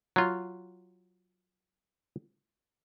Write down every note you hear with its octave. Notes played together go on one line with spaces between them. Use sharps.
F#3 F4